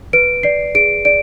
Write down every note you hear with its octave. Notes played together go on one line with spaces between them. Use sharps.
B4 D7
D5 C7
G#4 D7
D5 D7